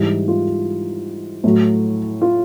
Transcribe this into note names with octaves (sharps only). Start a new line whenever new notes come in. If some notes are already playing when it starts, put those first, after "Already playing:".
Already playing: G#2 E3 G3
F4
A2 F#3
F4